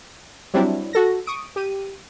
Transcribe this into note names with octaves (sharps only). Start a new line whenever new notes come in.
F#3 G3 C4 D4 E4
F#4 A4 A#6
C#6 D#6 D7
G4 D#7